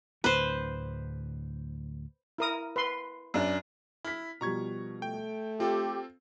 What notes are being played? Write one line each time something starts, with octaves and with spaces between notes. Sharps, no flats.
D2 A2 D3 B4 C5
E4 A#4 D#6
B4 C6
F#2 D4
E4 F6 B6
B2 F3 G3 A#5 C#6 G#6
A3 G5
C4 F4 G4 A4